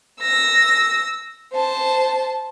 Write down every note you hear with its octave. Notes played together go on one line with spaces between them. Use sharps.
E6 A#6
C5 A5